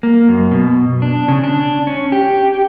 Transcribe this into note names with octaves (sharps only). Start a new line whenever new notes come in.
A#3
F#2
B2
D4
C#3
D4
C#4
G4